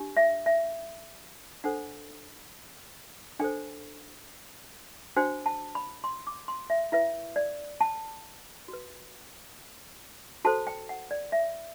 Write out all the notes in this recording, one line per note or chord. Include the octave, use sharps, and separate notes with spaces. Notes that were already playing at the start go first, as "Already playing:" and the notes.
Already playing: D4 G4
E5
E5
D4 A4 C5 F#5
D4 A4 C5 G5
D4 F#4 C5 G5
A5
B5
C6
D6
C6
E5
E4 B4 E5
D5
A5
F#4 B4
F#4 A4 C5 A5
G5
F#5
D5
E5